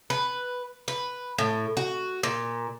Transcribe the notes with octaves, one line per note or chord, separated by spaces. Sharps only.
B4
B4
A2
F#4
A#2